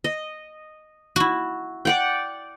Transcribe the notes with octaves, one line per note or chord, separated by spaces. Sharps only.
D#5
E4 F#4
D5 F#5 G5